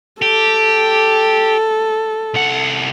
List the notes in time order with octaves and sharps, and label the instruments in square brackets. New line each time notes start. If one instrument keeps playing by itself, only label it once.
[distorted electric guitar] G4 [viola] A4
[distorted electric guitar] C2 F#5